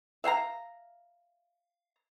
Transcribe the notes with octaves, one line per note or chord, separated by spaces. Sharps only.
E5 F5 G5 A#5